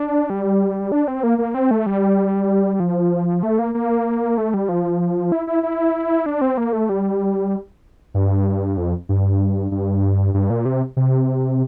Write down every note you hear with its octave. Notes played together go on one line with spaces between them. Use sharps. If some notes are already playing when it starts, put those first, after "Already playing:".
Already playing: D4
G3
D4
C4
A#3
A#3
C4
A3
G3
F3
A3
A#3
A#3
A3
G3
F3
E4
E4
E4
D4
C4
A#3
A3
G3
G2
F2
G2
G2
G2
A#2
C3
C3